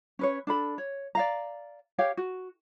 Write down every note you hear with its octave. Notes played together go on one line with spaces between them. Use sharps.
C#4 B4 C#5
D4 A4 B5
C#5
D5 F5 A#5
G4 C#5 F5 G5
F#4